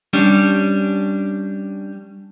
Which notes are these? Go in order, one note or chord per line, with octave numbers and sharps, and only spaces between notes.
G3 C#4 D4